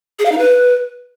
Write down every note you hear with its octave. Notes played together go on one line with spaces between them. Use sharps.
G#4
F5
D#4
B4